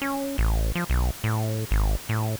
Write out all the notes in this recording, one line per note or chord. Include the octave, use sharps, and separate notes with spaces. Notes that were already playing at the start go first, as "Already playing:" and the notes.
C#4
A1
F3
B1
A2
G#1
A2